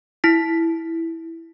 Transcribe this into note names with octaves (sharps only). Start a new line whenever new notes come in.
E4 B6